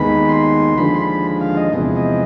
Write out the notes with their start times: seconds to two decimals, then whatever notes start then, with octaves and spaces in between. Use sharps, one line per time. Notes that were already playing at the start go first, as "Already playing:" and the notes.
Already playing: D#2 D#3 G#3 B3 B5
0.29 C6
0.78 D#2 D3 F3 G#3 B5
0.95 C6
1.02 B5
1.41 F5
1.57 D#5
1.73 E2 C3 F3 G#3 B3
1.96 D#5